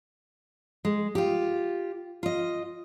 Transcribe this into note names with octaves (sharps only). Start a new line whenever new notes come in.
G#3
F4 G4
F4 D#5